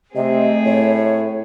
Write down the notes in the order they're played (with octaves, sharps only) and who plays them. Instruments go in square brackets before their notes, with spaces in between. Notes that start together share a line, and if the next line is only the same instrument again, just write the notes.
[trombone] C3 [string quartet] A3 C4 G#4 [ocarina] D#5
[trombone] A2 [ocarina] C#5